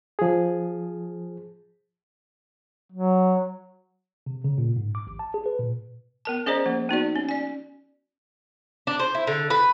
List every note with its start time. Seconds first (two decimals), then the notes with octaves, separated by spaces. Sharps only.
0.19 F3 G#4
2.92 F#3
4.26 C3
4.44 C#3
4.58 A#2
4.76 G#2
4.95 D6
5.07 A1
5.19 A5
5.34 G#4
5.46 B4
5.59 A#2
6.25 B3 A#4 A5
6.46 C#4 G#4 C5 D5 D#5 A#5
6.66 F3 A#3
6.89 B3 D#4 F#4 D5
7.16 C#4
7.29 D5 G#5
8.87 D4
8.99 C5
9.15 E4
9.27 D3
9.50 B4